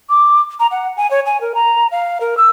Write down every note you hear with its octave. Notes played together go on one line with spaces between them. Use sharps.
D6
A#5
F#5
G#5
C#5
G#5
A#4
A#5
F5
A#4
E6